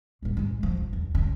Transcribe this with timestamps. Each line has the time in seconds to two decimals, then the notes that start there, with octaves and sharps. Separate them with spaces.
0.22 A2 B3
0.37 G#2 G#3
0.63 F3
0.77 F2
0.93 E2
1.15 E2 C#3